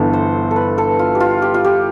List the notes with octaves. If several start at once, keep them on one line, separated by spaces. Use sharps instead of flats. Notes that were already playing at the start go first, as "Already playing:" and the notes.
Already playing: G1 G2 E3 B3 A4
C5
A4
B4
A4
F4
G4
F4
G4
F4
G4